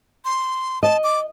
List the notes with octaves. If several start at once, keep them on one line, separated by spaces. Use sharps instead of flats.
C6
D#5 A5
D6